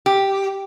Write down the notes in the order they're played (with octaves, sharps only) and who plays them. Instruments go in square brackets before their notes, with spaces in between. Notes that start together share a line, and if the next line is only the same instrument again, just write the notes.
[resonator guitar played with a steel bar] G4